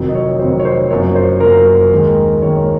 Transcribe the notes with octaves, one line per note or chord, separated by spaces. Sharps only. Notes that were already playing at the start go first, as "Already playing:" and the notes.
Already playing: F1 F2 D#3 F#3
D#5
C#5
F1 F2 D#3 F#3 C5
C#5
C5
F#1 F#2 F3 A#3 C#5
C5
F#1 F#2 F3 A#3 A#4
D#2 D#3 G#3
D#2 D#3 G#3 C#5